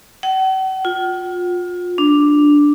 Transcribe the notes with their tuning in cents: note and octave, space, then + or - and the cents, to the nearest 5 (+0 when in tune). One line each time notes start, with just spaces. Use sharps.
F#5 +45
F4 +30
D4 +0